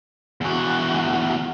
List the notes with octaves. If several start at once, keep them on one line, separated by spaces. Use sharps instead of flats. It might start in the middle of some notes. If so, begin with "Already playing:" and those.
E2 F#4